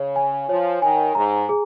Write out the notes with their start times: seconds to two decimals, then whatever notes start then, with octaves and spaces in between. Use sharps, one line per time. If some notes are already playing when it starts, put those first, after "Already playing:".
Already playing: C#3 C#5
0.16 G#5
0.48 F3 C#5
0.82 D#3 G#5
1.15 G#2 A#5
1.49 G#4